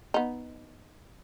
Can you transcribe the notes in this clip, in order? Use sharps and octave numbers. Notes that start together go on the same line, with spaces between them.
B3 D#4